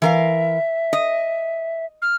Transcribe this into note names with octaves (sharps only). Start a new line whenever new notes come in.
E3 A#4 E5 F5
D#5
F6